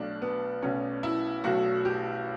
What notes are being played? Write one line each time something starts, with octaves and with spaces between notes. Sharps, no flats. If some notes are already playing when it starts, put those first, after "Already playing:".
Already playing: B1 B2 A3 D4
B3
B1 B2 A3 C#4
E4
B1 B2 A3 F#4
G4